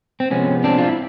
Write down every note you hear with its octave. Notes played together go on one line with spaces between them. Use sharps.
C4
C3 F3 G#3 B3 C#4
C4 D4
F4
E4